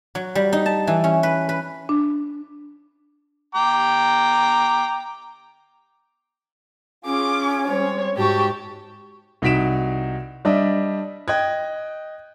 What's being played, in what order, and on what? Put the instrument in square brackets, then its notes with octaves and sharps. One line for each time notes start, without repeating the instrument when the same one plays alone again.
[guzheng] F#3
G3
D#4
A5
E3
C#4
B4
B4
[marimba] D4
[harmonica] G5 A#5 D6
[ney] C#4 [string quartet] F4 G#4 [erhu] D6
[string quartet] G3 G#3 C4 [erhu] C#5
[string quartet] G#2 A5 C#6 [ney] F#4 [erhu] G4
[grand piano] C2 D#4 F#4 B6 D7 E7
G3 D4 D#5 E5
D#5 G5 F#6 G#6